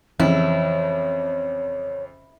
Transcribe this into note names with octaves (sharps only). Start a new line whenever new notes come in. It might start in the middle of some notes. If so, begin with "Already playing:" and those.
F2 C#3 E3 F3 E4 C#5